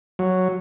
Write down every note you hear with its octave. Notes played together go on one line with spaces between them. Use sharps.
F#3